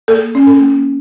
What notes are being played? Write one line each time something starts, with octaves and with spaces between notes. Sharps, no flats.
A#3 A4
C#4
A4
A#3